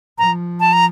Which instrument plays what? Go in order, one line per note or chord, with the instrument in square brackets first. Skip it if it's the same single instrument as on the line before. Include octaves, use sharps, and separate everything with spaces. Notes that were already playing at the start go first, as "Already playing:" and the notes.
[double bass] F3 [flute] A#5
[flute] A5
A#5